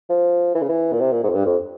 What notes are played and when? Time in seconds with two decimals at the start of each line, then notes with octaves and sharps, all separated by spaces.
0.09 F3
0.55 E3
0.61 C#3
0.69 E3
0.92 A#2
1.00 C3
1.12 A#2
1.23 G#2
1.30 F2
1.35 G2
1.46 F2